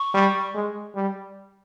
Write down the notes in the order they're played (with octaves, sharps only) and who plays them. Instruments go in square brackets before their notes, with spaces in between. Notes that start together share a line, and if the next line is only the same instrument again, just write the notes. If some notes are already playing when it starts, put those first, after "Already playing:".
Already playing: [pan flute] C#6
[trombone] G3
G#3
G3